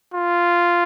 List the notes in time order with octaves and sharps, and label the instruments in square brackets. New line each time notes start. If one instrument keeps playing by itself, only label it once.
[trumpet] F4